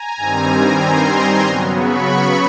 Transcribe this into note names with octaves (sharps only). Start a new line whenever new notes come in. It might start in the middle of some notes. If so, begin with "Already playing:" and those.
Already playing: G#5 A#5
G2 D#3 G3 C4
A#5 C6
C#3 F#3 B3
B5 C#6